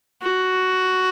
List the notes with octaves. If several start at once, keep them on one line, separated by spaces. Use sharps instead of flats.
F#4